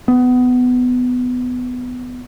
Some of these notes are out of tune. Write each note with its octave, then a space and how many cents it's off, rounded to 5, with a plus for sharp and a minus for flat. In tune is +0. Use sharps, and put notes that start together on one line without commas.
B3 +15